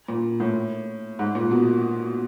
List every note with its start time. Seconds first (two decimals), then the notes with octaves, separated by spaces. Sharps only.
0.08 A#2
0.40 A2
1.19 G#2
1.35 A#2
1.51 B2